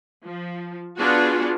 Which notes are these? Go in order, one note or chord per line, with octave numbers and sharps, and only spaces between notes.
F3
B3 D4 F4 F#4 G#4